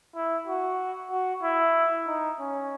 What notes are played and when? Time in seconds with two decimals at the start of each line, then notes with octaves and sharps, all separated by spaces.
0.15 E4
0.47 F#4
1.11 F#4
1.43 E4
2.07 D#4
2.39 C#4